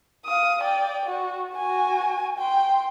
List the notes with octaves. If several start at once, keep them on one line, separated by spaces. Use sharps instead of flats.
F5 D#6
D5 G5
F#4
F#4 G#5
G5 C6